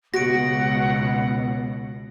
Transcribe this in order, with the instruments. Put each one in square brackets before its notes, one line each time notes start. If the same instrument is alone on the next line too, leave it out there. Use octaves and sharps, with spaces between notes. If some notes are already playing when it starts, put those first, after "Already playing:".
[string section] C#2 B2 [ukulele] F#4 [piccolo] F#5 [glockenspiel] A#6 D7